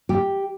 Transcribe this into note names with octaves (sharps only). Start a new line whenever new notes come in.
G4